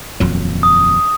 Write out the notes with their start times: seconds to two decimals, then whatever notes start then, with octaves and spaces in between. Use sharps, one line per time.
0.20 D#1 F2 F#3
0.63 D#6